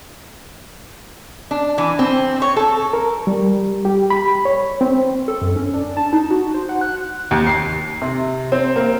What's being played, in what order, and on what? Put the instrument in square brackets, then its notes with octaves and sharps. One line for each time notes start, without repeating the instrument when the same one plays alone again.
[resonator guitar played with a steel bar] D4
E3
C4
C#5
A4
[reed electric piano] A#4
G3
G4
B5
C#5
C4
[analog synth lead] A4
F#2
C#4
D4
A5
D#4
F#4
C5
F#5
F#6
[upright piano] D#2
C7
C3
C4
A#3